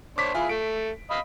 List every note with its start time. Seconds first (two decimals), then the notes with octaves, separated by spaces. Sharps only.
0.18 D4 C5 C#5 D6 B6
0.35 E4 F4 G#4 G#5
0.49 A3 D7
1.11 D#5 F5 B5